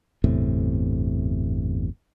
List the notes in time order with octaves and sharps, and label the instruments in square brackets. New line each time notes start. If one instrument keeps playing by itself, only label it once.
[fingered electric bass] G1 E2 A2 C3